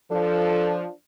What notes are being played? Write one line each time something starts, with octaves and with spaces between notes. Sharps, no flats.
F3 D4 A4